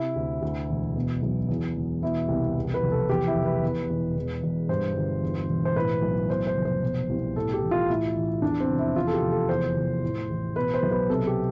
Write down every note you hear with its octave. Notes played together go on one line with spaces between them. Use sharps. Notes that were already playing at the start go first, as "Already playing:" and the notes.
Already playing: C3 E4
D2
D2
E1
B2
B1
E2
E1
B2 E4
C2
E2
B4
F1
A4
E2 G4
E4
F1
B4
E2
E1
E2
E1
G2 C5
G1
E2
E1
C5
A2 B4
B1
E2 C5
C5
F1
C5
B2
C2
A2 A4
G4
A1
F4
A2 E4
A1
E2 D4
C4
F1
E4
E2 F4
A4
G4
F1
A4
E2 C5
F1
A2
A1
B2 B4
C5
B1
B4
C3 A4
G4